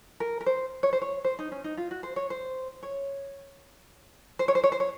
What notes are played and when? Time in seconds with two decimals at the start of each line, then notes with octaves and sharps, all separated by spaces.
0.20 A#4
0.41 A#4
0.46 C5
0.83 C#5
0.93 C5
1.02 C#5
1.24 C5
1.39 D#4
1.52 C#4
1.64 D#4
1.77 F4
1.91 F#4
2.03 C5
2.16 C#5
2.30 C5
2.83 C#5
4.39 C5
4.48 C#5
4.55 C5
4.64 C#5
4.72 C5
4.80 C#5